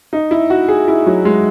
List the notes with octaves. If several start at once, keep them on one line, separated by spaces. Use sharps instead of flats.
D#4
E4
F#4
G#4
E4
F#3
G#3